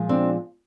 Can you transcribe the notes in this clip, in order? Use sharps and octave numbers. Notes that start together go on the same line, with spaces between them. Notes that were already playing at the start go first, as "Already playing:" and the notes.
Already playing: A#2 F3 G#3
C4 D4